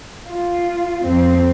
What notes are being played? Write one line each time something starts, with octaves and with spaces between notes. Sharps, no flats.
F4
F2 F3 C4